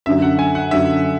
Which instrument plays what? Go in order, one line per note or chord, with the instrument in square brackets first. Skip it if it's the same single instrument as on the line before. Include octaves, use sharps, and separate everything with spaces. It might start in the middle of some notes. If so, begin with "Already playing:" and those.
[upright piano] F#2 D3 F#3 [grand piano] E5
[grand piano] F#5
G#5
F#5
[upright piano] F#2 D3 F#3 [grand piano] E5